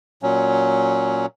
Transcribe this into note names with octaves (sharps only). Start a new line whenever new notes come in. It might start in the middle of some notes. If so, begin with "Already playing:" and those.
A#2 F#3 C#4